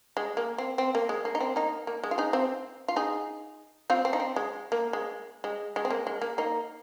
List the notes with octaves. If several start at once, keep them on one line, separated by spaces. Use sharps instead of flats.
G#3
A#3
C4
C4
A#3
G#3
A#3
D#4
C4
A#3 D#4
A#3
G#3
F4
D#4 G#4
C4 F4
F4
D#4 G#4
C4 F4
C4
D#4
C4
G#3
A#3
G#3
G#3
G#3
C4
A#3
G#3
A#3
A#3 D#4